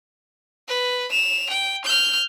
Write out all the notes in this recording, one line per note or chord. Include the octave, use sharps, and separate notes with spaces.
B4
E7 F7
G5
F6 G6